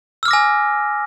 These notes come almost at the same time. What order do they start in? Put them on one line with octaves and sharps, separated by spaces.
E6 F6 D6 A#6 G#5